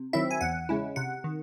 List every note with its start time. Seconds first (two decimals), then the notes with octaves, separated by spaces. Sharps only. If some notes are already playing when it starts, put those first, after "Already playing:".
Already playing: C3
0.13 D#3 F#3 C4 E4 E5
0.31 G#5
0.41 E2 F#5
0.69 C#3 G#3 C#4 E4
0.96 C3 F#5
1.24 D#3